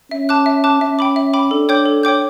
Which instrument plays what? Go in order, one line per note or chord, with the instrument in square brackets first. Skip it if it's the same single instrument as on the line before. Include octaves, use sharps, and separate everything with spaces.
[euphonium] C#4 [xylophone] E5
[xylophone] A5 D6 F#6
E5
A5 D6 F#6
[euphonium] C#4 [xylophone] E5
[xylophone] G5 B5 D6
E5
G5 B5 D6
[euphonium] D4 [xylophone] A4
[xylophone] C#5 G5 D6 G6
A4
C#5 G5 D6 G6